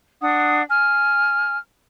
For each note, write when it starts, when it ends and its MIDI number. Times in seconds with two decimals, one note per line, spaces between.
0.20 0.61 62
0.20 0.61 78
0.20 0.61 87
0.68 1.58 80
0.68 1.58 89